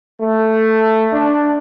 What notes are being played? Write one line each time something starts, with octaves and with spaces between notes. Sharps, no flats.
A3
D4